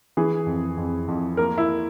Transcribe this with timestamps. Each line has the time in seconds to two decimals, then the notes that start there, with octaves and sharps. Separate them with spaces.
0.17 E3 G#4
0.47 F2
0.78 F2
1.08 F2
1.37 A#3 A#4
1.58 E4